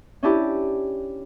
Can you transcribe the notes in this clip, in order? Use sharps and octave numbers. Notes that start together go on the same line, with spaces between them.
C#4 D4 E4 G4